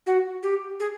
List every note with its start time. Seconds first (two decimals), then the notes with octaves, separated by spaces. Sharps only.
0.06 F#4
0.43 G4
0.80 G#4